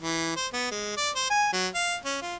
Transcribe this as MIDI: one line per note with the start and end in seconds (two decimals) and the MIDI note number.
0.01 0.36 52
0.37 0.47 72
0.53 0.68 59
0.71 0.93 56
0.97 1.10 74
1.16 1.26 72
1.30 1.50 80
1.53 1.68 54
1.75 1.96 77
2.05 2.17 61
2.22 2.36 65